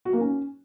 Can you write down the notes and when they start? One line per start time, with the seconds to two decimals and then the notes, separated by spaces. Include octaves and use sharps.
0.05 F#4
0.13 A#3
0.21 C#4